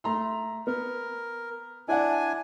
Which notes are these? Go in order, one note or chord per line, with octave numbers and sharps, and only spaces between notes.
A3 A#5 C6
B3 A#4
D4 E4 D5 F#5 G#5